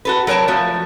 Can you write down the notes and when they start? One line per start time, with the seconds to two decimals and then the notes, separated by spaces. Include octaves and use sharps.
0.05 F#4 A4 B4
0.27 F#3 A#4 C#5 G5 A5
0.48 F3 A3 F#4